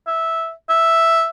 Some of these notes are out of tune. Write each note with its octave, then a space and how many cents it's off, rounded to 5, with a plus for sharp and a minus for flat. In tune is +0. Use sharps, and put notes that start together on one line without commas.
E5 -10
E5 +0